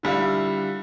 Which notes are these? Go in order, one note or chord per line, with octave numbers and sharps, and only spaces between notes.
D3 G3 E4 F4